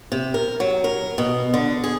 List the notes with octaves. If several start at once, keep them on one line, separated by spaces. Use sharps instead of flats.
C3
A#4
F#3
A#4
B2
D3
G#4